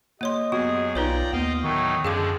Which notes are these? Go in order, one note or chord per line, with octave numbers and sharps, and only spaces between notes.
A#3 G4 C#5 D#5 C6
F#2 B3 F#4 G#4
B1 D#4 F4 B4 C#5 D5 G5 A#5
D#2 B3 D#5 F5 G5
A2 D#3 F#3 D#4 G5 C#6
F#2 D3 F3 G#3 G#4 F5 D6